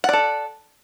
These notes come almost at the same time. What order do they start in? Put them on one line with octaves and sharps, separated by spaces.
F#5 D5 A4